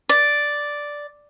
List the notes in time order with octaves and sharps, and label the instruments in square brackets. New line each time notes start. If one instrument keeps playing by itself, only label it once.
[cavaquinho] D5